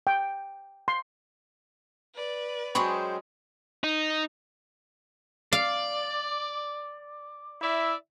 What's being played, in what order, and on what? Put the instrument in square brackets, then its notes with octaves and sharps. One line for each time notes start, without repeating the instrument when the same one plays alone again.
[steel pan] G5
C6
[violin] B4 D5
[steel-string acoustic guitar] F#3 G#3 C#4 [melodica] G#4 C5 G5 [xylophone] B5 C#6
[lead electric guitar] D#4
[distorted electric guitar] D5 [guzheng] F5
[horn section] E4 D5 E5